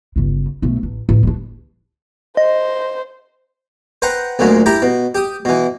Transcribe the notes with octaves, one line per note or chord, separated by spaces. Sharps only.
G1 C#3
B1 A3
A1
A1
G3 D4
C5 D#5
B4 C5 F#5 G5 A#5
D2 A#2 F#3 G#3
E4 G4 G5 A#5 B5
B2
G4 D#6
B2 E3